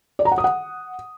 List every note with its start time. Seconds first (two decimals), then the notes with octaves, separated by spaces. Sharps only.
0.19 D5
0.25 A#5
0.32 F#5
0.38 D#6
0.44 F#5